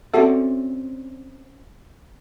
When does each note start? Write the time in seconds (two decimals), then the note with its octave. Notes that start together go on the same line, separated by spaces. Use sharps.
0.14 C4 C#4 F#4 A4 D5 E5